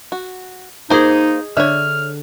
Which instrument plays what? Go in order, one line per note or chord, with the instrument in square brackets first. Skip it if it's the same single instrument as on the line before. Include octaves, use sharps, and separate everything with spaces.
[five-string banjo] F#4
[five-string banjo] A#3 C5 [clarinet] D#4 [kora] G#4 D#5
[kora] D3 [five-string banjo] C#5 E5 [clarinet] F6